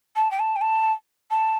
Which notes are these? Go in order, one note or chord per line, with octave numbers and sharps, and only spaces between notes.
A5
G5
A5
G5
A5
A5